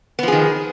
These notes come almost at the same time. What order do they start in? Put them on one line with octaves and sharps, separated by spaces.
B3 F3 G#4 D#3